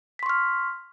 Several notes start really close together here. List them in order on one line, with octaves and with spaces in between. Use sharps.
B6 C6 C#6 F6